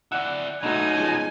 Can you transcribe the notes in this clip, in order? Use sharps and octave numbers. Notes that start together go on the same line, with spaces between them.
E4 D5 F#5 F#6
F#2 B2 F#3 A3 D#4 G#5
F3 G#3